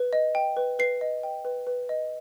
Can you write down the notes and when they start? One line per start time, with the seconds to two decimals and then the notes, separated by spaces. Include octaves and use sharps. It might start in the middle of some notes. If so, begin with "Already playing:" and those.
Already playing: B4
0.13 D#5
0.35 G5
0.57 B4
0.79 B4 C7
1.01 D#5
1.23 G5
1.45 B4
1.67 B4
1.89 D#5